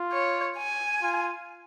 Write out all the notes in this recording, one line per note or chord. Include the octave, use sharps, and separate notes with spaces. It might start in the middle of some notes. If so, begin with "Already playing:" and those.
Already playing: F4
C#5
G#5
F4